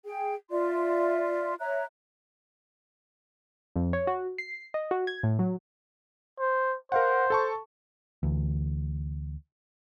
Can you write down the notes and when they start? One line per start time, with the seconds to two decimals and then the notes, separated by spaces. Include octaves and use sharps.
0.06 G#4 G5
0.51 F4 D5 E5 C6
1.60 C#5 E5 A#5 F#6
3.76 F2
3.93 C#5
4.07 F#4
4.38 C7
4.74 D#5
4.91 F#4
5.07 G#6
5.23 A2
5.39 F#3
6.39 C5
6.92 A#4 C5 F5 F#5
7.30 A4 A5 C#6
8.23 D2 E3